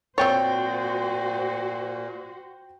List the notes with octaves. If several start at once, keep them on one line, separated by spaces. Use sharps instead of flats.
A#2 C4 F#4 C5 C#5 G5 A6